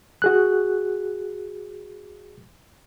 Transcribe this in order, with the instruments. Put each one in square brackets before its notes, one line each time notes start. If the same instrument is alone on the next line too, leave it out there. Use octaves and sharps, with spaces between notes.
[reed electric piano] F#4 G#4 F#6